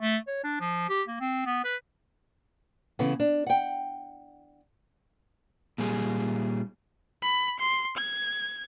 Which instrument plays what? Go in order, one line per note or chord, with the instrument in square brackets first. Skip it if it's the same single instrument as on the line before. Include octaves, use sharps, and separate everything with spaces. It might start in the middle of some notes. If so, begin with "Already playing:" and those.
[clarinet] A3
C#5
D4
F3
G4
A#3
C4
B3
B4
[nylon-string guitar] C#3 E3 B3 A4
D4
F#5 G5
[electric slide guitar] A#2 G3 G#4
[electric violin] B5
C6
G#6